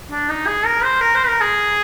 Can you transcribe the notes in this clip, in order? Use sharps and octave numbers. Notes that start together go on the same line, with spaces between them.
D4
D#4
G#4
A#4
C5
A#4
C5
A#4
G#4